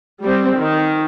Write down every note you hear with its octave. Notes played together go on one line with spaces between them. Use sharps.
G3 C4
D#3